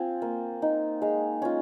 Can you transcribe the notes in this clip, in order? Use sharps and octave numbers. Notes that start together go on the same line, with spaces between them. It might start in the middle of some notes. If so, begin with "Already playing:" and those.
Already playing: C4 F4 G#5
A#3
D#4
G#3 A#5
C#4 F4